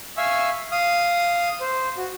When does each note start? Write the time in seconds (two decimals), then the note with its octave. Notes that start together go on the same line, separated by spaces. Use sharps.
0.17 E5 F5 G#5 C#6 E6
0.71 F5 D#6
1.60 C5
1.97 F#4